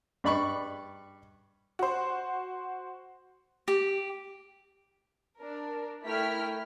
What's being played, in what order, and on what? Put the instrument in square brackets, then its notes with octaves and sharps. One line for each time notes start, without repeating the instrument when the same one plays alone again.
[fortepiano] G2 D5 B5 C#6
[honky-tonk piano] F#4 C5
[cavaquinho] G4
[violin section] D4 A#4
A3 E4 A#4 G5 F6 B6